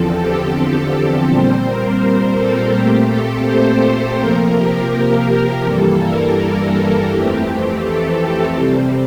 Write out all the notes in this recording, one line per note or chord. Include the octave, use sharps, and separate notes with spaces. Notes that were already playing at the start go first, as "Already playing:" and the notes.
Already playing: E2 D3 F3 C4 A4
G4
A4
A#2 G3 C4 C5
A#4
A4
A#2 A3 C4 G4
A4
C5
C3 F3 A#3 A#4
G4
G2 E3 G3 A#3 A4
A#4
A#4
A4
F2 E3 A3 C4 G4
A4
C3 G3 C4